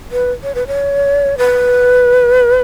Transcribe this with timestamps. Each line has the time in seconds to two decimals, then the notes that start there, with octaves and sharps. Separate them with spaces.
0.12 B4
0.43 C#5
0.55 B4
0.67 C#5
1.38 B4